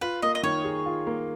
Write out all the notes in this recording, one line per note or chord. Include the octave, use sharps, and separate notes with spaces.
F4 B4
A#3 D#5
D#5
D#3 C#5
G#4
F4
A#3